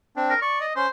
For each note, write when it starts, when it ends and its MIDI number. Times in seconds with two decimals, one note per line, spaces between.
0.16 0.34 60
0.16 0.34 62
0.30 0.39 70
0.42 0.66 74
0.42 0.59 85
0.61 0.72 75
0.76 0.86 61
0.76 0.88 72